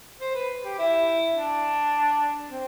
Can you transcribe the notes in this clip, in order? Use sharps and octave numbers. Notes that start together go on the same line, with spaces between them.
C5
B4
G4
E4
D4
C4